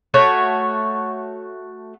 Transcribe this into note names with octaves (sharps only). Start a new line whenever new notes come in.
A3 F#4 C#5